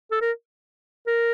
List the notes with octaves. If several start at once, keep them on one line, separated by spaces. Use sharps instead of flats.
A4
A#4
A#4